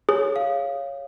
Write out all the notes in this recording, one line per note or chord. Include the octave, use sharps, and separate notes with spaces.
G#4 C#5
F5